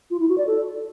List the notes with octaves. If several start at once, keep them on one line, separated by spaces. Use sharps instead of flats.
F4
E4
F#4
D5
A4